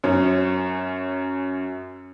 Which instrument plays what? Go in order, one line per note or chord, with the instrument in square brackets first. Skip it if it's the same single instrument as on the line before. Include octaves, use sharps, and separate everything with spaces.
[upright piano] F#2 C#4